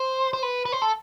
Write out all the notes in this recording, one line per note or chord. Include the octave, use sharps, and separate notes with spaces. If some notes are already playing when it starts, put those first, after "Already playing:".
Already playing: C5
C5
B4
B4
C5
A4